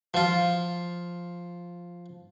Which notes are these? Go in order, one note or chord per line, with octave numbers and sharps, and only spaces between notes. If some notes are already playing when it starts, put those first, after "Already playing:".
F3 F4